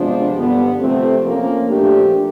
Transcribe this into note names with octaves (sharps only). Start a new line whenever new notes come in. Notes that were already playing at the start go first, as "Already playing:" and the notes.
Already playing: C3 F3 G#3 B3 D4
G2 D3 G3 B3
C3 F3 A3 C4
F3 A#3 C#4
A#2 F3 A3 D4 G4